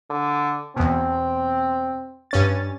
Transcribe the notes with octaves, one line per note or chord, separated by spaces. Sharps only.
D3
E2 B2 C4
G2 C#4 A6